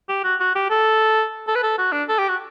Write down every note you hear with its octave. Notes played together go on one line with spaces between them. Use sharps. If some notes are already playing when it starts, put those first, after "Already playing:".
G4
F#4
F#4
G4
A4
A4
B4
A4
F#4
D4
A4
G4
F#4